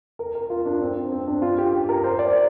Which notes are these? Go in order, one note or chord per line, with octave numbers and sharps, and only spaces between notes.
A#4
A#4
F4
D4
C4
C4
D4
F4
G4
G4
A#4
C5
D5